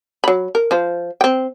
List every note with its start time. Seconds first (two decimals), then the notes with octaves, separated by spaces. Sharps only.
0.24 F#3 B5
0.55 A#4
0.71 F3 C5
1.21 C4 G5